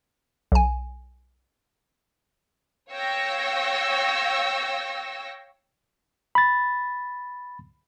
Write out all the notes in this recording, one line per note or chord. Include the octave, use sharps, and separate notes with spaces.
B1 G#5
C#5 F5 G5 C#6 E6 A#6
B5 A6